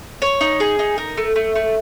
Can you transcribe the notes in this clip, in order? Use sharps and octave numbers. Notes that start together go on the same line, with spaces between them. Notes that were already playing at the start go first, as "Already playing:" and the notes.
C#5
D#4
G#4
D#4
A#4
A3
A3
A3